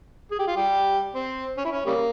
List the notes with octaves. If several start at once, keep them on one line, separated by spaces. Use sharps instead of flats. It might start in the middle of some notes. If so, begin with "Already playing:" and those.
G#4
G4
F4
G3 G4
C4
C#4
E4
C#4
C#3 G3 A#3